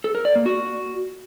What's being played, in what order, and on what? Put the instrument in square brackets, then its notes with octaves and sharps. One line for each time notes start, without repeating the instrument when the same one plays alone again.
[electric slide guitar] A4
A#4
D5
A#3
F#4